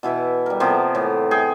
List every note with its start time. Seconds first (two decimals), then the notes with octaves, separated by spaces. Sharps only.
0.03 B2 E3 E4 E5
0.46 G3 A#4
0.60 C3 F3 A#3 B3
0.95 A2 E3
1.31 G#4 G5